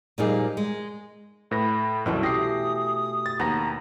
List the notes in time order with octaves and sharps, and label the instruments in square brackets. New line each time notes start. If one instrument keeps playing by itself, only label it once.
[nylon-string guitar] A#2 F3 G3 A#3 D#4 G#4
G#3
[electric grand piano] A2 B4 A#6 [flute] B5
[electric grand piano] C2 F#2 [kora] B2 E3 A3
[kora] G4 [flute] D#6 [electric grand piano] A#6 C7
[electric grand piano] A6
[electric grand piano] D#2 A#6 [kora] B3 [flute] A#5